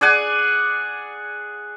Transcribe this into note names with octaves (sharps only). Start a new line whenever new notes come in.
G#4 D5 F#5 G#5